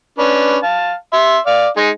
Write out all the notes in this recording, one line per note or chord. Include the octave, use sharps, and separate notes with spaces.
C#4 D4 B4
F5 A5
E5 C6
D5 F5
G#3 D#4 G#5